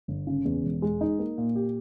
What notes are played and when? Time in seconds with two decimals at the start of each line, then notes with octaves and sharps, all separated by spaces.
0.08 G1
0.27 C#3
0.45 E2
0.63 E1
0.82 G#3
1.01 D#4
1.19 A#3
1.38 A#2
1.55 G4